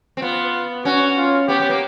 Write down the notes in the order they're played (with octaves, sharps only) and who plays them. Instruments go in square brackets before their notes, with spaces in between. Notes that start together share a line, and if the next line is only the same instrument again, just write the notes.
[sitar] C4
[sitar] B3 [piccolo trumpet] F4
[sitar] C#4 [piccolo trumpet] F#4
[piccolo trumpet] F4
[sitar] B3 [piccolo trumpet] G4
[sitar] B3
A#3